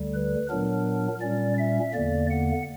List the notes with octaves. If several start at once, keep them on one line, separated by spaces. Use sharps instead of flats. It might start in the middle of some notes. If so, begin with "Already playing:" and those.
Already playing: D2 D3 G3
B4
A#2 F#3 B3 D4 A#4
A#2 G3 C#4 D5
E5
E2 D3 A#3 D5
F#5